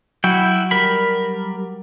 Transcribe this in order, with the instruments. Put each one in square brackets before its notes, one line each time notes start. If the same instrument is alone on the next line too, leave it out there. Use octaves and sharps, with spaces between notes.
[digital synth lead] F#3 [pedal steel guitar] E4 F#4 G5
[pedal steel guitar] G3 A#4 B5